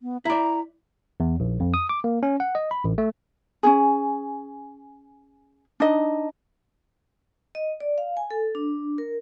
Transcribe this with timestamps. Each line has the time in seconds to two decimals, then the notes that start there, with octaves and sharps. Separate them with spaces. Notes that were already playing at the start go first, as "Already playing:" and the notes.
0.02 B3
0.25 E4 D5 A#5
1.20 E2
1.40 A#1
1.60 F2
1.74 D#6
1.89 D6
2.04 A#3
2.23 C#4
2.40 F#5
2.55 D#5
2.71 B5
2.84 A1
2.98 A3
3.63 C#4 D#4 G#4
5.80 D4 D#4 D#5
7.55 D#5
7.80 D5
7.98 F5
8.17 G#5
8.31 A4
8.55 D4
8.98 A#4